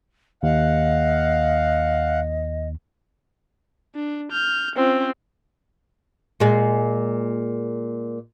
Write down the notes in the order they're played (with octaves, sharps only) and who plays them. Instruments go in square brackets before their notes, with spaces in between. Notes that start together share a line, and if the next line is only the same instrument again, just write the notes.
[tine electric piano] D#2 [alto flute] D#5 [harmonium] F5 F#5
[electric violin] D4
F6 G6
[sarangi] C4 [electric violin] C#4 F4
[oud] A#2 G#3